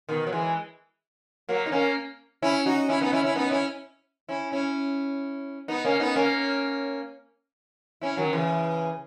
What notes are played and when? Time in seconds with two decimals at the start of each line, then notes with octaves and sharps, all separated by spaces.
0.09 B2 D#3
0.27 F#3
0.32 E3 G#3
1.49 F#3 A#3
1.66 D#4
1.72 A#3 C#4
2.42 C#4 E4
2.66 D#4 F#4
2.88 C#4 E4
3.01 B3 D#4
3.13 C#4 E4
3.24 C#4 E4
3.35 B3 D#4
3.51 C#4 E4
4.29 C#4 E4
4.52 C#4 E4
5.68 B3 D#4
5.85 A#3 C#4
6.00 B3 D#4
6.16 A#3 C#4
8.01 C#4 E4
8.17 D#3 F#3
8.33 C#3 E3